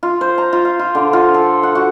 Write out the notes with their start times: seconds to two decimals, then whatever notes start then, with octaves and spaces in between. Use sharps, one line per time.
0.03 F4
0.21 C5
0.38 A#5
0.53 F4
0.65 F5
0.79 F4
0.95 D3
1.13 F4
1.34 A4
1.63 F#5
1.75 F#4